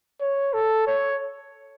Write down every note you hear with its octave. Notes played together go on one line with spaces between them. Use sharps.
C#5
A4
C#5